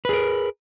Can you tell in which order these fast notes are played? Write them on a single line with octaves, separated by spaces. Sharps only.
B4 G#4 A#4